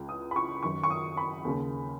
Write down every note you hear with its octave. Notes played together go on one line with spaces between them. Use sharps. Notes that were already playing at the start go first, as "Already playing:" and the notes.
Already playing: C#2 C#3
D#6
B5
C#6
F#2 D#3 C#6
C#6
D#6
B5
D#2 C#3